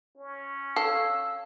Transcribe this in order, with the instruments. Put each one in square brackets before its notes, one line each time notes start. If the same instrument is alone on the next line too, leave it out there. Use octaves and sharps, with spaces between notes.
[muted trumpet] C#4
[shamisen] A4 [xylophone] F5 [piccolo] E6